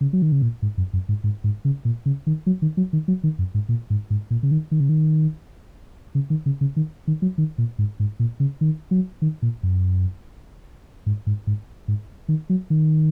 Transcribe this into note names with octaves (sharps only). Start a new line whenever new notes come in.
C#3
F#3
D#3
C#3
A#2
G#2
F#2
F#2
G#2
G#2
G#2
C#3
A#2
C#3
D#3
F#3
D#3
F#3
D#3
F#3
D#3
F#2
G#2
A#2
G#2
G#2
A#2
C#3
D#3
D#3
C#3
D#3
C#3
D#3
C#3
C#3
D#3
D#3
F#3
D#3
A#2
G#2
G#2
A#2
C#3
D#3
F#3
D#3
A#2
F#2
G#2
G#2
G#2
G#2
D#3
F#3
D#3